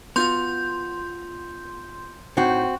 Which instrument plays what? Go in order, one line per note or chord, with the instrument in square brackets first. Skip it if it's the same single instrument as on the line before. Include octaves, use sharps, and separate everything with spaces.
[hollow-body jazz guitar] B3 F4 F#4 [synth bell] C6 G6
[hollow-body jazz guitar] A2 D#4 [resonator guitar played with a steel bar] C4 F#4